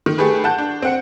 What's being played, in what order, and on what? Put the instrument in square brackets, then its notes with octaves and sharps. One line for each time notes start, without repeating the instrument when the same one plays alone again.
[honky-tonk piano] D#3
A3 G4 G#4 B4
F#5 A5 G6
D4
C4 F#5 C#7